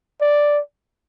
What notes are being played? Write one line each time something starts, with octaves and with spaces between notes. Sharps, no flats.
D5